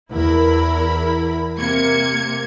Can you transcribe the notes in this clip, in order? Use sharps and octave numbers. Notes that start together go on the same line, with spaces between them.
E2 E4 A#4 B5
C3 A#3 G#6 C#7